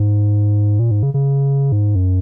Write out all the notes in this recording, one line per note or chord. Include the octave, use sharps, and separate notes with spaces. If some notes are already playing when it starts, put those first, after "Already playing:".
Already playing: G#2
A#2
G#2
C#3
C#3
G#2
F#2